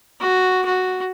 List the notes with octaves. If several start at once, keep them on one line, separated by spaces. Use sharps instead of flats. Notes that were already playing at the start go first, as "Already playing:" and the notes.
F#4
F#4